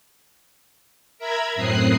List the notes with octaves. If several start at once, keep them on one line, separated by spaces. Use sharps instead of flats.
A#4 E5 A#5 B5 G#6
F#2 A2 C4 D#6 F#6 C7